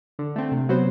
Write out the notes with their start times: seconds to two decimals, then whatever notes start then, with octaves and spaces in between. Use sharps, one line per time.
0.19 D3
0.36 A3 C4
0.52 C3
0.69 F#3 B3 F#4 C5